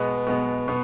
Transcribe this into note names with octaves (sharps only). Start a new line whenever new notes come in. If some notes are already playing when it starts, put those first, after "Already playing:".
Already playing: B2 G#3 B3
B2 G#3 B3
B2 B3